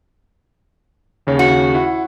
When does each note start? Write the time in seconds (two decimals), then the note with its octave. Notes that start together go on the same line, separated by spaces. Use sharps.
1.27 D#2 C#3 C#5
1.39 F#4
1.74 E4 F#5